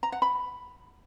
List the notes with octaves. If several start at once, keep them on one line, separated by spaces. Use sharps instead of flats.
A#5
F#5
B5